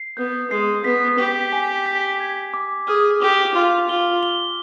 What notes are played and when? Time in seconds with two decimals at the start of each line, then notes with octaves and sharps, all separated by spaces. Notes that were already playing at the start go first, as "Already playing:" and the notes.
Already playing: C7
0.17 B3 G6
0.51 G#3 C7
0.84 B3 B6
1.18 G4 B6
1.53 G#5
1.86 B6
2.20 G#6
2.54 D6
2.87 G#4 F6
3.22 G4 D6
3.55 F4 B6
3.89 F4 G7
4.23 G7